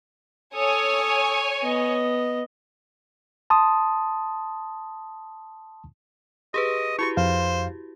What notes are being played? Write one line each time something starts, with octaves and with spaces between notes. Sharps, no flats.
A4 C#5 G#5 D#6
B3 D#5
A5 C6 D#6
G4 G#4 B4 D#5
E4 F#4 G4 C#6
F2 C5 F5